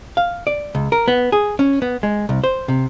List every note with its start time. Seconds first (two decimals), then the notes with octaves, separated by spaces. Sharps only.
0.17 F5
0.47 D5
0.75 C#2
0.92 A#4
1.08 B3
1.32 G#4
1.59 C#4
1.82 B3
2.03 G#3
2.29 C2
2.44 C5
2.68 C3